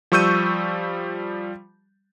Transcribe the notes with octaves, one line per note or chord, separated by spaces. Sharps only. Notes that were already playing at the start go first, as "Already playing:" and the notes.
F3 G3 C#6 E6 G6 D#7